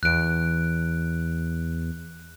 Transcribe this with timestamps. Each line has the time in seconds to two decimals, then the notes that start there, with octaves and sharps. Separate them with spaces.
0.03 E2 F#6 D7